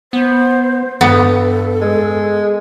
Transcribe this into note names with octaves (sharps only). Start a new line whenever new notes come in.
B3 C5
G2 B3 A4
G#3